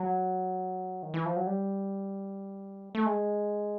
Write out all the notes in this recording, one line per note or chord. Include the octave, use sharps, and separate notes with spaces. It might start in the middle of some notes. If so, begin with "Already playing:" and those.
Already playing: F#3
D#3
E3
F3
F#3
G3
A3
G#3